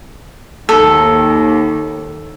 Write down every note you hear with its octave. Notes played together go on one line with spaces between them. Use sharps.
D#2 A4